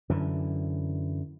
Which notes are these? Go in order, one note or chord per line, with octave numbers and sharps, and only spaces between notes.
F#2 D3 E3